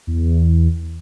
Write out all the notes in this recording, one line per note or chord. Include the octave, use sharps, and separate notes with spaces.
E2